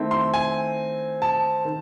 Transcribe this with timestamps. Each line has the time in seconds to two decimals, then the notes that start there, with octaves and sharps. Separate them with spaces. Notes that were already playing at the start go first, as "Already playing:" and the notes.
Already playing: D#3 A3 C4 E4
0.11 C6
0.34 G#5
1.22 A5
1.65 D#3